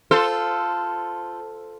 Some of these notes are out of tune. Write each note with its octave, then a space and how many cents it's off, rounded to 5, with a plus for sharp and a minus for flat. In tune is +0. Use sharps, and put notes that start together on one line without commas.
F4 +0 A4 +0 C5 -15